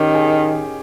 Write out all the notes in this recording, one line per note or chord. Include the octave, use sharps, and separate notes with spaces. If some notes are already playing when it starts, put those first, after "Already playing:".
Already playing: D#3 C#4 G4
G#4